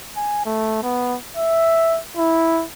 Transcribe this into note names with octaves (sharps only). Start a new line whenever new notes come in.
G#5
A3
B3
E5
E4